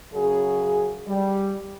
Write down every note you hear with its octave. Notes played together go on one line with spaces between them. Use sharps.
F#2 C#3 F#4 G#4
G3